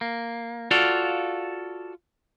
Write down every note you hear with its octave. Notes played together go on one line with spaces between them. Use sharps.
A#3
F4 F#4 A4 D5 F5